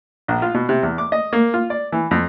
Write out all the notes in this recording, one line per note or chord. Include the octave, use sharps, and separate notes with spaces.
A#1
F4
B2
C3
E2
D6
D#5
A#3
F4
D5
E3
F2